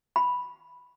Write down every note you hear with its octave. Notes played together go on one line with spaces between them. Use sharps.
B5